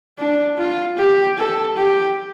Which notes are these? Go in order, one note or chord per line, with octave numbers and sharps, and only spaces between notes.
D4
F4
G4
A4
G4